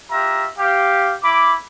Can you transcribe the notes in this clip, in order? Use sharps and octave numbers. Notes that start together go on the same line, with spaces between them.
F4 G4 E5 A#5
G4 F5
E4 B5 D6